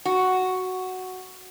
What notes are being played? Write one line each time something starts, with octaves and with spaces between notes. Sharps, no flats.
F#4